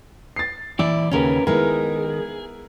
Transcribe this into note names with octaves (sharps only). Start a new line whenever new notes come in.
A6 C7
A#2 E3 E4 D5
D#2 C#3 C#4 A#4 B4
D#3 G#3 B3 E4 G#4 A#4